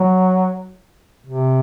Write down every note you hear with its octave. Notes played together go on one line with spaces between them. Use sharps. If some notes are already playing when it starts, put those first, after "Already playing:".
Already playing: F#3
C3